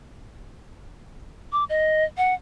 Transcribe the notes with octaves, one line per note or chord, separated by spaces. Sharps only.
D6
D#5
F#5